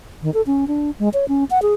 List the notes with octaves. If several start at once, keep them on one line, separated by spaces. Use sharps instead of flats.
D#3
A4
C#4
D4
G#3
C#5
C#4
F#5
G#4